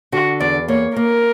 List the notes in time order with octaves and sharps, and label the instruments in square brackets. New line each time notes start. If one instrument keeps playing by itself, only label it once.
[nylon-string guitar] D3 [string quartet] F#4
[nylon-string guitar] E2 [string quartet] D5
[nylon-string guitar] A#3 [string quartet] C#5
[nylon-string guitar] A#3 [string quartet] A#4